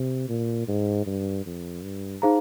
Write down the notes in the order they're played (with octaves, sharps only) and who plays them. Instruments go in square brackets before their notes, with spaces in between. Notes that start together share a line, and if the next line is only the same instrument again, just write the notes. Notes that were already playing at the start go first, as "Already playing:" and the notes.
Already playing: [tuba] C3
A#2
G#2
G2
F2
G2
[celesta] D#4 G#4 C5 F5 A#5